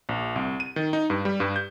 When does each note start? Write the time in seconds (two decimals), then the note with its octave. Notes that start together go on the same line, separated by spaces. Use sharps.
0.09 A#1
0.36 C2
0.60 D#7
0.76 D#3
0.93 D#4
1.10 G2
1.25 G3
1.40 G2
1.56 G6